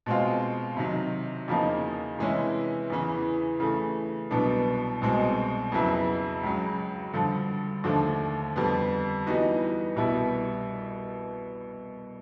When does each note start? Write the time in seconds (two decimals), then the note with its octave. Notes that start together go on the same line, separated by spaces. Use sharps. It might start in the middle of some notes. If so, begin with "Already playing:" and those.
0.06 B2 G#3 C4 F4
0.77 C3 D#3 F#3
1.48 E2 C#3 F3 A#3 D#4
2.19 C3 E3 G#3 C#4 E4
2.90 E2 C#3 E3
3.60 C#3 E3 A3
4.31 C2 B2 F#3 B3 D4
5.01 C2 B2 G#3 C4
5.72 F2 C#3 F#3 B3 E4
6.43 C#2 C#3 F#3
7.14 G2 D3 F3
7.84 D#2 D3 F3 A3 D4
8.56 F2 D3 G3 B3
9.26 E3 G3 B3 D#4 F#4
9.96 C2 B2 G3 B3 E4